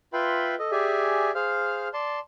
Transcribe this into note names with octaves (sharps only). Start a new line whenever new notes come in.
F4 B4 E5 G5 B5 C6
A4 D#5
G4 G#4 D5 E5 G#5
G#4 C5 F5 F6
D5 A5 C6